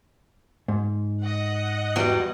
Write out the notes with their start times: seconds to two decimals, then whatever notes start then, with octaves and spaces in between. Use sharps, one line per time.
0.68 G#2
1.21 D#5 F#5
1.96 E2 F#3 G3